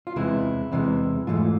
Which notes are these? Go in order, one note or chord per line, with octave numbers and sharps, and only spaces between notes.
F4
E2 C3 E3 G#3 E4
E2 C3 E3 G#3
G#2 E3 A3 F4